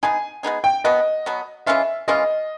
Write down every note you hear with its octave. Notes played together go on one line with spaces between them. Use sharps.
G#3 B3 D#4 G#4 G#5
G#3 B3 D#4 G#4
G5
B2 F#3 B3 D#5
B2 F#3 B3
E3 G#3 C#4 F4 E5
E3 G#3 C#4 F4 D#5